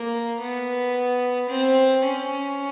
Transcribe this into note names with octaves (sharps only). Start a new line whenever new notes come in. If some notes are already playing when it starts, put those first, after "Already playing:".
Already playing: A#3
B3
C4
C#4